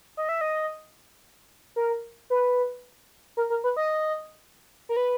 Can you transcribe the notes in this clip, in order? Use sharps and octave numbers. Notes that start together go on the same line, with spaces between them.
D#5
E5
D#5
A#4
B4
A#4
A#4
B4
D#5
A#4
B4